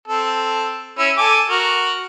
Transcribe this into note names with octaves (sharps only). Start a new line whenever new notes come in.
C4 A4
C#4 E4 E6
A4 G#5 D6
F#4 A#4